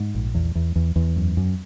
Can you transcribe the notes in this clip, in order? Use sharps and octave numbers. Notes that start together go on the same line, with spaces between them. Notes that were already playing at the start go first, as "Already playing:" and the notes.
Already playing: G#2
A#1
E2
E2
E2
E2
F#2
F#2